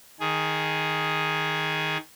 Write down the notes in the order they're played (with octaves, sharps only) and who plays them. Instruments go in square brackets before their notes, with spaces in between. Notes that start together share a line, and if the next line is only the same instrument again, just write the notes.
[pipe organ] D#3 G#4